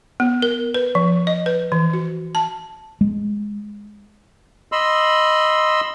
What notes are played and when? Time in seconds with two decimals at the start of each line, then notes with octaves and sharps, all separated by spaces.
0.20 B3
0.42 A#4
0.74 B4
0.95 F3
1.27 D#5
1.46 B4
1.72 E3
1.93 F#4
2.35 A5
3.01 G#3
4.72 D#5 B5 C6 E6